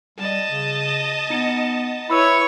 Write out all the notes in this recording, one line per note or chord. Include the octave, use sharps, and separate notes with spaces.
G3 D#5 A5
C#3
B3 D#4 C#7
E4 B4 C#5 B5 E6